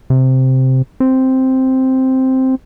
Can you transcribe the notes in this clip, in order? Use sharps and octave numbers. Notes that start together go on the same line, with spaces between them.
C3
C4